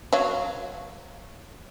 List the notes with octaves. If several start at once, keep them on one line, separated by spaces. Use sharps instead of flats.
F#3 C#5 F5